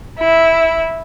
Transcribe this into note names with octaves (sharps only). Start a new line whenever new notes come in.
E4